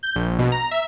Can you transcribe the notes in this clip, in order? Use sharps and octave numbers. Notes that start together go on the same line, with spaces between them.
G6
A#1
B2
A#5
E5